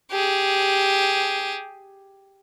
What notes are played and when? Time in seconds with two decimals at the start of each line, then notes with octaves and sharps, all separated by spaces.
0.11 G4 G#4